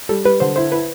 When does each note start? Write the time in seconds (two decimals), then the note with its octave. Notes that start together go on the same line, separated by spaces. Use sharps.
0.09 G3 A4
0.25 G3 B4
0.40 D3 C5
0.56 E4 C5
0.72 E4 B4